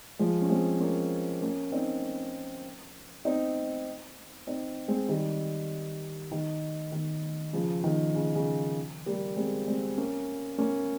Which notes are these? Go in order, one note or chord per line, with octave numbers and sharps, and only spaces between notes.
F3 G#3
C#4
G#3 C4
A#3 C#4
A#3 C#4
C4 D#4
C4 D#4
C4 D#4
G#3 C4
D#3 G3
D#3
D#3
C#3 F3
D#3
C#3
C#3
G3 A#3
G#3 C4
G#3 C4
A#3 C#4
A#3 C#4